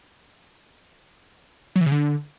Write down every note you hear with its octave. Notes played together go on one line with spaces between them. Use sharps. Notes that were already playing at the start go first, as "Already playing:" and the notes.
F#3
E3
C#3
D3